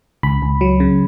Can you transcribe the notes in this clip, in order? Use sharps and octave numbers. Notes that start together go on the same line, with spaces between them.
C#2 B5
C#2
F#3
C#3